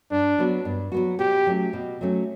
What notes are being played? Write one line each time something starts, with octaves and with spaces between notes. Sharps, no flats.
G2 D4
F#3 B3 F#4
G2
F#3 B3 F#4
B2 G4
F#3 A3 C#4
B2
F#3 A3 C#4